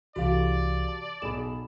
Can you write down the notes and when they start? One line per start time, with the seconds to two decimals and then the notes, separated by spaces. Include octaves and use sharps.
0.16 C2 E3 F#4 G4 A4 D5 F5
0.88 A5
1.22 B1 G#4 B5 E7